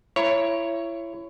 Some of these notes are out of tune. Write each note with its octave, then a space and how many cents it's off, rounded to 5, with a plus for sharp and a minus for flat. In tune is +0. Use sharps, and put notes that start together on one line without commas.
E4 +30 C#5 +0 A#5 +30